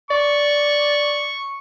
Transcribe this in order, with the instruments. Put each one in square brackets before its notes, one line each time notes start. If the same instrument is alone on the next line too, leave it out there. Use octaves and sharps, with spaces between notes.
[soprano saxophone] D5 [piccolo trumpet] C#6